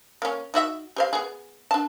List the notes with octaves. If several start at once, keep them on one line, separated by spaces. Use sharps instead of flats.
A#3 C#4
D#4 F#4 E5
G4 C5 F5
B3 G#4
D4 A5